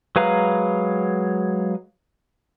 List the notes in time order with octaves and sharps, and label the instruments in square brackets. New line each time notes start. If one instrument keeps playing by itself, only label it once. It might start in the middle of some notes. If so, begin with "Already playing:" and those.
[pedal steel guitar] F#3 G#3 B4 F5 A#5